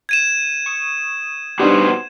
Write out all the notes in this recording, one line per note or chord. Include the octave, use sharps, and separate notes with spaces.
G#6 D#7 E7
C#6 D#6
G3 B3 D4 D#4 F#4 C5